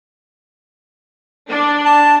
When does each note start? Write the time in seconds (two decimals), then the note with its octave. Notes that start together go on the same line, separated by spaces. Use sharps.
1.49 D4
1.85 A5